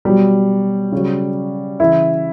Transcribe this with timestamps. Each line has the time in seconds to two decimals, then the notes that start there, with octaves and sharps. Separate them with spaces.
0.05 B2 F#3 G3
0.92 C#3 F#3
1.80 C#3 E3 E4